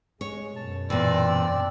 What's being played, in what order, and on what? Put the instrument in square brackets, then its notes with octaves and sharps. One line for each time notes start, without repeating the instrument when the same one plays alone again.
[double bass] G#3 [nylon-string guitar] C#5
[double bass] F#2 B2 [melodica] A5
[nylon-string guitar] E2 A#2 [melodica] C4 D4 E6 [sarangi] D5